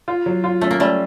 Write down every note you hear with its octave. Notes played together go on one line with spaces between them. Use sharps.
F4
F#3
F4
A3 C#4
A#3
G3 A3 C#4